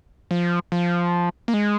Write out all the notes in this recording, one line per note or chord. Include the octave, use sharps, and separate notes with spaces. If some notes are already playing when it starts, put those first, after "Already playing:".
F3
F3
A#3
G#3